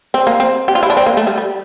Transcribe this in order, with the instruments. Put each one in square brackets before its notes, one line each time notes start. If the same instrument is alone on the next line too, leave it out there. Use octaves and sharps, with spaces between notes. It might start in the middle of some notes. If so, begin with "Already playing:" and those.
[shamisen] C4
A#3
C4
G4
F4
E4
D4
C4
A#3
A3
G3
G3